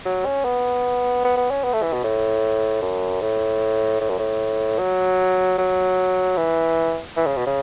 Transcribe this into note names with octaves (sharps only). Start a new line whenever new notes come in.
F#3
C#4
B3
B3
B3
C#4
B3
A3
E3
B2
A2
F#2
A2
A2
F#2
A2
F#3
F#3
E3
E3
C#3
B2
C#3